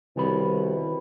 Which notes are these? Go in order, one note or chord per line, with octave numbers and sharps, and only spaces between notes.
C2 B2 D#3 C#5 B5